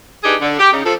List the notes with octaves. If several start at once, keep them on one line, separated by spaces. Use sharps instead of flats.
D4 D#4 G4 G#4 B4
D3
G4
C#3 D#4
F3 A4